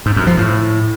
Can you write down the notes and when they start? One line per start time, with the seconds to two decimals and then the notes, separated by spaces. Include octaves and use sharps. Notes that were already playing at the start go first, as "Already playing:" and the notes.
0.06 G#2
0.16 F#2
0.27 F3
0.38 A2